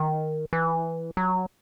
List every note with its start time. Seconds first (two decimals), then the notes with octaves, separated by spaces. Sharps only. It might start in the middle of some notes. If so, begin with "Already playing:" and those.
Already playing: D#3
0.53 E3
1.17 F#3